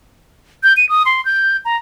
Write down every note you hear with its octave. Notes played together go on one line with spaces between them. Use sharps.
G6
D#7
D#6
C6
G6
A#5